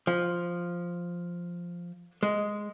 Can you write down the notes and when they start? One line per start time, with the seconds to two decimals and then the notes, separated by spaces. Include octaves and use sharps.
0.07 F3
2.23 G#3